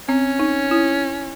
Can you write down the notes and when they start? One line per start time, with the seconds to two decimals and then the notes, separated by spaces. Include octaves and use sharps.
0.08 C4 C#4
0.40 D#4
0.71 E4